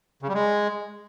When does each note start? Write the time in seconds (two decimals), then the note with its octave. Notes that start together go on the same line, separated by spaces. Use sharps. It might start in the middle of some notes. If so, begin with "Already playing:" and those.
0.22 C#3
0.28 G3
0.34 G#3